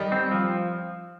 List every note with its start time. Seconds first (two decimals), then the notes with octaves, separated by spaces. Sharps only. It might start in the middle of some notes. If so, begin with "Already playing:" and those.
Already playing: D#3 G3
0.12 C4
0.31 F3